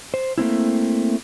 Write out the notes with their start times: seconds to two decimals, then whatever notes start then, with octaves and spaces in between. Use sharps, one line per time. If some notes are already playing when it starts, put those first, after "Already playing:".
0.14 C5
0.38 A3 A#3 C4 E4